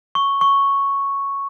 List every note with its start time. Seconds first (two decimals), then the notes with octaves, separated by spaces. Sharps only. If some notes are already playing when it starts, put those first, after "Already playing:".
0.15 C#6
0.41 C#6